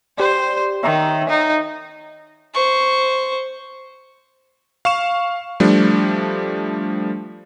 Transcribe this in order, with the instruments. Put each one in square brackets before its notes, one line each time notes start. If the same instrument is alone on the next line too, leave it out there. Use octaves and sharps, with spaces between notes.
[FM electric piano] G4 D5 [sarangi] C5
[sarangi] D#3 [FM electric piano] C#5 E5 A#5
[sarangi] D#4
[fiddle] C5 C#6
[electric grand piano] F5 C#6 E7
F3 G3 A3 D4